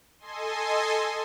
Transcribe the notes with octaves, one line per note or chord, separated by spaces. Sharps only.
A4 D#5 G#5 C6